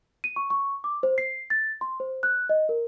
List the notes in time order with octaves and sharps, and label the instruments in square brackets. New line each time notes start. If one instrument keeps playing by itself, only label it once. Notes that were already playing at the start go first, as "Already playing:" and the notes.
[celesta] D#7
C#6
C#6
D6
C5
C7
A6
C6
C5
F#6
D#5
A#4